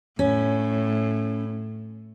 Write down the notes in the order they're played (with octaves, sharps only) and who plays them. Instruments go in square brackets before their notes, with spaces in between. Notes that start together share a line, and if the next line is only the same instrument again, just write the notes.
[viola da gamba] A2 [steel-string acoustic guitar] C#4